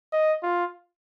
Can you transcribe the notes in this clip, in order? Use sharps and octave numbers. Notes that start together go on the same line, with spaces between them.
D#5
F4